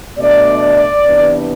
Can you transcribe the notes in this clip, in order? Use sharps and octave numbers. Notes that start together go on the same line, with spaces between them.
B2 A3 D4 D5
C3 E3 B3 D4